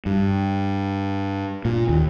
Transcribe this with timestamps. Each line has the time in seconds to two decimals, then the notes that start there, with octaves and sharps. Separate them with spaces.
0.06 G2
1.65 A#2
1.89 D#2